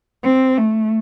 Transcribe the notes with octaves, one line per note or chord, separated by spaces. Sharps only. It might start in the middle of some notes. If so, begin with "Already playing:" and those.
C4
A3